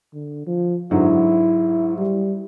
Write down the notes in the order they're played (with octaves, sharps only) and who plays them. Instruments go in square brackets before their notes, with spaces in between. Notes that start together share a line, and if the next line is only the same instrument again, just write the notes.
[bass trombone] D3
F3
[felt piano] G#2 D3 F#3 [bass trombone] E4
[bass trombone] G3